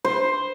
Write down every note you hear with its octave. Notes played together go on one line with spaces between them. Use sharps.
C5